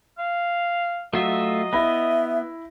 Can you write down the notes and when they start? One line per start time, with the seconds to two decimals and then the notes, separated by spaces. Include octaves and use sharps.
0.18 F5
1.13 F#3 A3 F4 D#5 E5
1.73 B3 E4 E5 B5 A#6